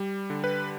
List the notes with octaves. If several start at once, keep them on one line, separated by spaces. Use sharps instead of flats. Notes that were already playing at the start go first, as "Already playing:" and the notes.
Already playing: G3
D3
B4